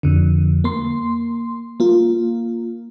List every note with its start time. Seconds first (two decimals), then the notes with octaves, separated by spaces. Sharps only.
0.03 F2 D3
0.64 A#3 C6
1.80 A#3 F4